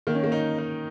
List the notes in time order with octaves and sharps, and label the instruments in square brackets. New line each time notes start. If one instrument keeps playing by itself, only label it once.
[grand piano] D#3 [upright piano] A#3
[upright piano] C#4
A#3
[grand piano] D#4
D#4